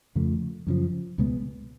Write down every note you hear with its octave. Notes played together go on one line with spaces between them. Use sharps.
F2 C#3 F3 A3
F#2 C#3 F3
C#2 B2 G#3 B3